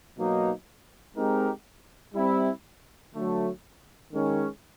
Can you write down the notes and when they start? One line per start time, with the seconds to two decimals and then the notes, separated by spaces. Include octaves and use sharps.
0.17 B2 F#3 A#3 D#4
1.16 G#3 C4 D#4 G4 A#4
2.15 G3 C4 E4
3.14 D3 F#3 A3
4.13 D#3 G#3 C#4